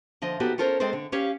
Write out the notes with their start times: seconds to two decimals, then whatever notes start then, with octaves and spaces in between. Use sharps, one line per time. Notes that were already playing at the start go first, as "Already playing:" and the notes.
0.22 D3 F3 D#5
0.40 B3 D#4 F#4 G4 A4
0.58 C#4 F4 A4 A#4 C5
0.80 G#3 C4 G#4 A4 C5
0.93 D3
1.12 C#4 G4 C#5 F5